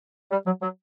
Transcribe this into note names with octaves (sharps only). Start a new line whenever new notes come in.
G3
F#3
F#3